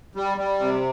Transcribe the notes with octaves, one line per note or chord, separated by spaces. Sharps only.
G3
G3
C3